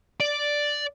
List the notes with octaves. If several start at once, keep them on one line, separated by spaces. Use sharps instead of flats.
D5